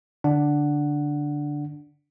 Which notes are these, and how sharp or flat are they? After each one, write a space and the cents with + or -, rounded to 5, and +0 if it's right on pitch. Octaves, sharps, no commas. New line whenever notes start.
D3 +0 D4 +0 F#5 +0